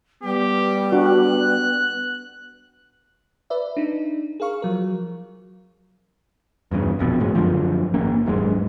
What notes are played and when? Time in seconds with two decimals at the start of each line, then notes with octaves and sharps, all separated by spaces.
0.23 G3 B3 G4
0.92 D4 F#4 F#6
3.50 B4 D5 E5
3.77 D4 D#4
4.40 G#4 A#4 F5 C#6
4.62 F3 F#3 A#4
6.71 E2 G2 A#2 C#3
6.99 A#1 F2 B2
7.20 F#1 A2 G#3
7.35 F#2 D3 F3
7.94 G#1 A#3 C#4
8.26 D#1 G#2 F#3 G#3